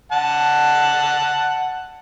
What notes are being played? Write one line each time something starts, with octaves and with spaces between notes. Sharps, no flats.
F#5 A5